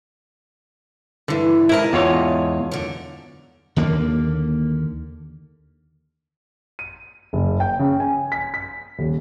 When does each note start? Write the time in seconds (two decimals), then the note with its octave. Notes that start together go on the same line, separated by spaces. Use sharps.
1.28 G2 D3 E3
1.69 G#2 E4 A#4 D#5 A5
1.93 E2 F4 C#5
2.71 F#2 D3
3.76 D#2 D3 A#3
6.79 D#7
7.33 F#1
7.60 G5
7.79 C#3
8.00 G#5
8.32 B6
8.54 B6
8.99 D#1